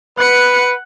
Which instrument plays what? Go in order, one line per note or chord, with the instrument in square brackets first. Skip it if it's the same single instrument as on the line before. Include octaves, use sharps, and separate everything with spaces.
[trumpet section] B4 [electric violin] F#5 C#7